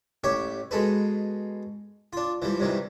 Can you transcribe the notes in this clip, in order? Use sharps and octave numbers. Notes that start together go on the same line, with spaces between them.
A1 G4 C#5 E5
B2 G#3 A4 B4
D4 F4
E3 F3 G3
G2 C3 D#3 E3